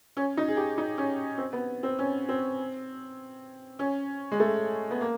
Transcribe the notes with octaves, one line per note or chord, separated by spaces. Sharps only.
C#4
D#4
G#4
G4
D#4
C#4
C4
B3
C4
C#4
C4
C#4
G#3
A3
B3
A#3